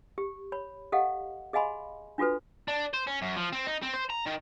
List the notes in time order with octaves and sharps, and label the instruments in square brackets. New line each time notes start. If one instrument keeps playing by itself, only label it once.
[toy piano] G4
C#5 B5
G4 A4 D#5 F5 F#5
G#4 D#5 F5 G#5 B5 C6
D4 F4 F#4 A4 B4
[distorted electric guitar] D4
C5
C#4
F#2
F3
C4
D#4
C4
C5
A#5
D#3